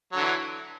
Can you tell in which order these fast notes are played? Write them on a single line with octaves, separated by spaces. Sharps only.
F#3 D3 E3